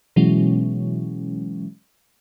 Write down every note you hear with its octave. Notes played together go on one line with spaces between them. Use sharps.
B2 E3 F#3 G#3 C#4